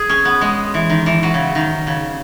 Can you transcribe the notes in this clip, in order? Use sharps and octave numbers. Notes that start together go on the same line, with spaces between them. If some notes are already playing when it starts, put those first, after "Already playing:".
Already playing: G#4
C#4
B3
G#3
E3
D#3
E3
F#3
C#3
D#3
C#3